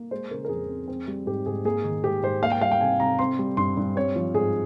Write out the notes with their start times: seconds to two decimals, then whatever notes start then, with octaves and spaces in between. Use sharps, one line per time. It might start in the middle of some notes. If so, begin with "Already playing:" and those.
Already playing: A#3
0.11 G#3 C5
0.31 C#3 A#4
0.45 A#4
0.49 F2 G#4
0.68 C4
0.88 C4
1.08 G3
1.26 G#2 G4
1.46 G#2 G#4
1.65 A#3 G#4
1.84 D#3
2.04 G#2 G4
2.23 G#2 C5
2.43 A#3 F5
2.52 G5
2.62 G3 F5
2.72 G5
2.80 C3 G#5
3.00 C3 A#5
3.19 C4 C6
3.39 G3
3.57 G2 C6
3.77 G2
3.96 C4 C#5
4.16 F3
4.34 G#2 G#4